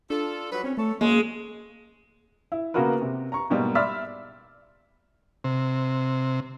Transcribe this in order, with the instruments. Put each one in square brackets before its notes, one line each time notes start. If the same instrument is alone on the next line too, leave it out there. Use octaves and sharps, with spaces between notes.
[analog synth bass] D4 [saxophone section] F4 A4
[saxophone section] F#3 G3 B4
[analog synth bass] C4 [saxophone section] C#4
[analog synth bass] A3 [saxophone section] A4 C#5
[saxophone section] F#2 A2 [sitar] G#3 [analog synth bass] A#3
[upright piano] E4
C#3 A#3 B3 F#4 A#4 B4
C3
A#5 C#6
G#2 B2 G3 A#3
D5 E5 B5 C6 F6 B6
[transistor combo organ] C3